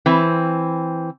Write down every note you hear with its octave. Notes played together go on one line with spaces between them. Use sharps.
E3 C4